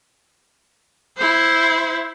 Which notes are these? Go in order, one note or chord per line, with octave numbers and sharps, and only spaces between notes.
E4 C5